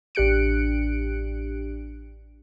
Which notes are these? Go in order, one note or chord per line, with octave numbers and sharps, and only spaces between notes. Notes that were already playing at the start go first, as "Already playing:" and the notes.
A1 D4 G4 F#6 C#7 D7